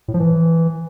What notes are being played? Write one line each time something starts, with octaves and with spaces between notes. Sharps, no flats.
A2
F3
E3